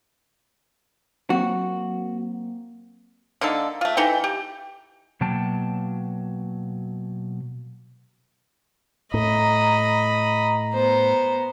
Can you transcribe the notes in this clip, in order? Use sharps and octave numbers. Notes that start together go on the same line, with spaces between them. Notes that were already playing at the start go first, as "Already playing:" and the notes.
F#3 A#3 C4 F#4
D3 A#3 D#4 A4
A3 F4
E3 D#4 A4 G5
G4
B2 F#3 A#3 G5 A5
A2 D#5 A#5 B5
B3 C5